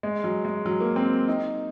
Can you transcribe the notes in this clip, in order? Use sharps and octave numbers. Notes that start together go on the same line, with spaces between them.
G#3
F#3
G#3
F#3
A#3
C4
D#4